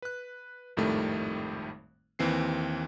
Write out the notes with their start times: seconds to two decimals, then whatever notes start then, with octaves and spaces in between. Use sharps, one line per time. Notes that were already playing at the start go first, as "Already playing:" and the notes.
0.02 B4 F#6
0.77 G#1 F2 A2 D#3 G3 A3
2.19 D#2 E3 C4 C7